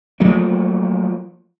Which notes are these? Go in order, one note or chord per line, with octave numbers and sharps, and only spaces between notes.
F3 F#3 A3 A#3